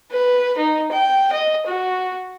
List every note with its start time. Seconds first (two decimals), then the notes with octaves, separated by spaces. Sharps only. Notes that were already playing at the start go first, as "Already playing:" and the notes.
0.11 B4
0.58 D#4
0.92 G5
1.32 D#5
1.66 F#4